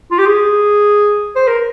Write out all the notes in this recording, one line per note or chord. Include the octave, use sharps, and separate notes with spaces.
F4
G4
G#4
C5
A#4